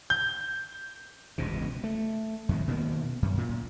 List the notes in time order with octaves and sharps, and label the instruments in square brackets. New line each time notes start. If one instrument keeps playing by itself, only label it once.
[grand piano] G6
[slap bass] E1 C#2 G2 B2
A3
F2 D#3
B2 D#3 A#3
F#2
A#2